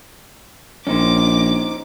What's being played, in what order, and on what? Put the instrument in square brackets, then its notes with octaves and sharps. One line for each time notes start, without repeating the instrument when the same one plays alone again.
[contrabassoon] A#1 [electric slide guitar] C#4 D#4 C5 [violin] D6